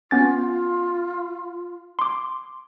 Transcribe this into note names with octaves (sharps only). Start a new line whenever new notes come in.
B3 C#4 F4 A6
C6 D6